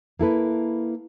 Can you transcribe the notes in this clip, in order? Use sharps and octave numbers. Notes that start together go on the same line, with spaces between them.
A#3 E4 A4 B4